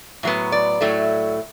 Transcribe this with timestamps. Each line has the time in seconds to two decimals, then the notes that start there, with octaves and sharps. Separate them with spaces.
0.23 A2 F#3 B3
0.52 D5
0.81 A2 F#3 A3